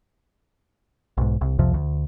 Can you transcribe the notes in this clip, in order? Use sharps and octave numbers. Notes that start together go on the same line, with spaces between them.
B1 G#2
C2
C2 F2 C3 F3
D2